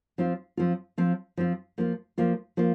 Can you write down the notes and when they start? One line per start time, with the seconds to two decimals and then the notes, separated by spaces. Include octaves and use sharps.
0.18 F3 C4 F4
0.57 F3 C4 F4
0.98 F3 C4 F4
1.37 F3 C4 F4
1.78 F3 A#3 F4
2.18 F3 A#3 F4
2.57 F3 A#3 F4